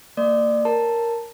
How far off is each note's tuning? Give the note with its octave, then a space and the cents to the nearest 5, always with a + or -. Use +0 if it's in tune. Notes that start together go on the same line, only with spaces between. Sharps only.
A#3 -30 D5 +25
A#4 +0 C#5 +0 A5 +5